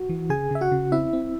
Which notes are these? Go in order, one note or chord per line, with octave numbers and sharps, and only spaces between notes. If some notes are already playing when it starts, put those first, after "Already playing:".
Already playing: F#4
E3
C#3 G#4 G#5
C#3 E5
F#4 F#5
C#3
C4 E4 E5
C4